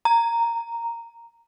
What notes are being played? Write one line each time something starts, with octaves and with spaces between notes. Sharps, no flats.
A#5